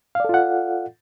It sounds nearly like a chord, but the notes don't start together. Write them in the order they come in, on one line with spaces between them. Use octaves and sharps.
F5 D5 A4 F4 F#5